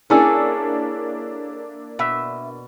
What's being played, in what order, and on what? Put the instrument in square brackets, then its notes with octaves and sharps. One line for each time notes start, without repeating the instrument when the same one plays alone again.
[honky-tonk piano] A#3 D4 E4 [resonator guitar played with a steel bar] C#4 G#4 [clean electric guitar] A4
[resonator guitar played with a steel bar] B2 [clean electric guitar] E5